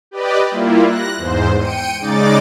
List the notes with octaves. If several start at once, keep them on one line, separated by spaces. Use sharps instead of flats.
G4 B4 D5 D#5
G3 A#3 E4 F4
F#6 A#6
E2 G#2 C5
G5 C#7 D#7
C#3 G#3 D#4 D5 D6 A6